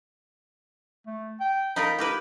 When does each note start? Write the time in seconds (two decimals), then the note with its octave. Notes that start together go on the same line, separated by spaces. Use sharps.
1.07 A3
1.40 G5
1.76 D#4 F4 A#4 B5
1.98 E4 G4 A#4 B4